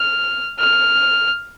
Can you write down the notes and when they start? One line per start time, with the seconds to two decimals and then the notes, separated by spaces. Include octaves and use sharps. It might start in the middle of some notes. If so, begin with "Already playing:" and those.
Already playing: F6
0.59 F6